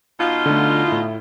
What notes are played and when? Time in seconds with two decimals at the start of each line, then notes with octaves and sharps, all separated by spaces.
0.19 B2 D#4 F4
0.46 D3 A3
0.88 A2 E4